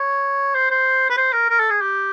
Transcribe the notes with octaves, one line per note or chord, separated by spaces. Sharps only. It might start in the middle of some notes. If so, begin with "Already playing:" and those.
Already playing: C#5
C5
C5
B4
C5
A#4
A#4
A4
G#4
G4